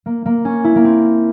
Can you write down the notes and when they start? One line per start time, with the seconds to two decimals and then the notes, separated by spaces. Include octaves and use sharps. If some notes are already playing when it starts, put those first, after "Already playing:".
0.06 A#3
0.26 A#3
0.45 C#4
0.64 E4
0.75 A#3
0.84 C4